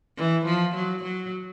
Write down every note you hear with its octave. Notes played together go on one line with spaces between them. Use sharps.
E3
F3
F#3
F#3